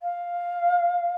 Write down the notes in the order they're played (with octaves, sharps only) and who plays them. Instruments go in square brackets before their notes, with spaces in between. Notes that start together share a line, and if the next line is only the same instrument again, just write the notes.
[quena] F5